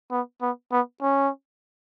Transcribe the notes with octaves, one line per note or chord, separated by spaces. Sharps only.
B3
B3
B3
C#4